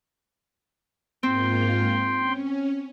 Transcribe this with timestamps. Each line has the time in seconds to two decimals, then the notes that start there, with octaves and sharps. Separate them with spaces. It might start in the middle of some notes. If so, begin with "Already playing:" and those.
1.23 G#2 A#3 C4 F4 G5 C6
2.19 C#4